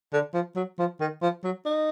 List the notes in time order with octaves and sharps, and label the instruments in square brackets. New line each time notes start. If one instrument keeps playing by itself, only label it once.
[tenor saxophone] D3
F3
F#3
F3
D#3
F3
F#3
D#4